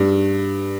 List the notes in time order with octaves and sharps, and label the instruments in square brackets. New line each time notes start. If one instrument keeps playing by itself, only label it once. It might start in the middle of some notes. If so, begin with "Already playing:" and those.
Already playing: [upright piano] G2